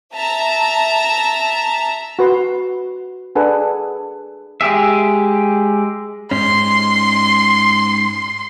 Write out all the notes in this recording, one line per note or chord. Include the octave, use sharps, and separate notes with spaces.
E5 A5 A#5
F#4 B4 C6
D4 G#4 A4 B4 F#5 G#5
G#3 G4 G#4 E5
G#2 C#4 C6